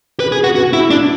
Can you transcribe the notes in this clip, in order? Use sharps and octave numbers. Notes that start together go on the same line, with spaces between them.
B4
G#4
F#4
F#4
E4
D4